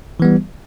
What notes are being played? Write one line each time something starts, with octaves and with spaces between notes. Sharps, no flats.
E3 G3 B3